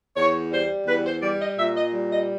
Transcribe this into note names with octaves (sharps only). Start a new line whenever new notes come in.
E2 C#5
G3 C5
E2 B4
C5
G3 D5
D#5
A#2 E5
D#5
G3
D#5